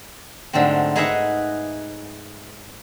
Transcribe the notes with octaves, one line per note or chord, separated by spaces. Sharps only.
G#2 D3 F#3 A3 C4
D#4 G#4 B4 D#5 E5 F#5